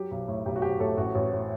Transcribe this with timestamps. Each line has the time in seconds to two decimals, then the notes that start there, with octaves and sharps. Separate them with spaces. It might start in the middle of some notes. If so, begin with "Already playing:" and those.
Already playing: F#3 G4
0.11 B1
0.28 A2
0.46 B1 G4
0.56 F#4
0.62 B1 G4
0.80 A2 A4
0.97 A1 F#4
1.15 A1
1.32 A2